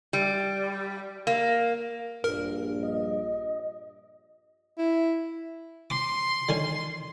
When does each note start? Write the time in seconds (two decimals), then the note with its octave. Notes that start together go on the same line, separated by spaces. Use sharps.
0.13 G3
1.27 A#3
2.24 A#1 G2 A#4
2.83 D#5
4.78 E4
5.90 C6 D6
6.49 D3 D#3 C#4